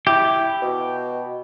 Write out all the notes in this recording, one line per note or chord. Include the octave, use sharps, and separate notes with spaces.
E4 G4
B2